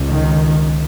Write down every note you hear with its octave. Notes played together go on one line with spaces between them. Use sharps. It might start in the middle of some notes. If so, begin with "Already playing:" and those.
Already playing: C#2
D#3